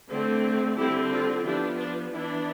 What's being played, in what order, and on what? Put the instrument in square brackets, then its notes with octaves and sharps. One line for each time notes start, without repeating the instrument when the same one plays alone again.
[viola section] D3 A3 C4
D3 G3 C4 E4 G4
F4 A4
F3 B3 D4 E4 G4
D4
E3 B3 D4 E4